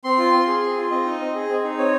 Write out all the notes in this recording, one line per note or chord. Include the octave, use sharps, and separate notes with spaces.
C4 C6
F4
C4
G#4
C4
F4
C4 D#5
D#4
C4
G#4
C4
D#4
C4 C#5